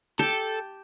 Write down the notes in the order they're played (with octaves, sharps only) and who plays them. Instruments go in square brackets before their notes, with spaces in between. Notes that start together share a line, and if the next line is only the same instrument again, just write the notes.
[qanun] G4 A5 [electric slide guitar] A4